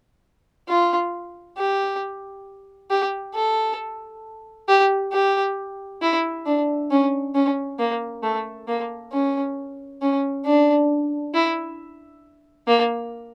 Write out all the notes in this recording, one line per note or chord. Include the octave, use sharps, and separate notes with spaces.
F4
G4
G4
A4
G4
G4
E4
D4
C#4
C#4
A#3
A3
A#3
C#4
C#4
D4
E4
A#3